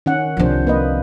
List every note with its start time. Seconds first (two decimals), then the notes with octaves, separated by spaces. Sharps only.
0.06 D#3 C#4 F#5
0.37 C2 C3 F3 D4 C5
0.67 A#3 B4 D#5